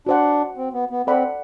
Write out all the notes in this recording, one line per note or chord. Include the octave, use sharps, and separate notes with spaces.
D4 F#4 C5 F#5
C4
B3
B3
C4 A4 D5 F#5 B5